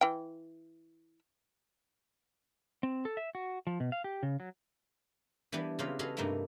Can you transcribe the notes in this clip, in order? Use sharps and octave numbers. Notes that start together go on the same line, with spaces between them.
E3 G5
C4
A4
E5
F#4
F3
B2
F5
G4
C#3
F#3
E3 G3 B3 D4 E4
C#3 F#3 C4 E4 F4 G4
F#4 G#4 A4 B4 D#5 F5
G2 C3 A3 A#3 D#4 E4